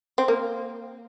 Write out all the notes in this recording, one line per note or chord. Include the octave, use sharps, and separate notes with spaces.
C4
A#3